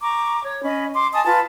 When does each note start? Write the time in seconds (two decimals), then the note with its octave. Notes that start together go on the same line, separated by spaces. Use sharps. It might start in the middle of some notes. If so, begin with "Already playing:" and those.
0.02 A#5 C#6 D6
0.44 C#5
0.63 C#4 D#5 B5
0.94 C6 D6
1.13 D#5 G#5 A5 D#6
1.25 F4 B4 A5